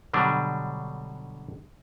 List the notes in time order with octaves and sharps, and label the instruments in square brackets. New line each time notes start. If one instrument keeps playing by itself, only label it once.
[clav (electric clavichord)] B2 D3 F#3 G3 D4